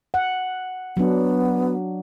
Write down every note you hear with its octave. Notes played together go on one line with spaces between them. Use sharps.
F#5
F#3 B3 D4